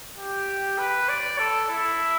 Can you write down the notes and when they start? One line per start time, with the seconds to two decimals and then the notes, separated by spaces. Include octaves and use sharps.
0.17 G4
0.78 B4
1.09 D5
1.39 A4
1.69 E4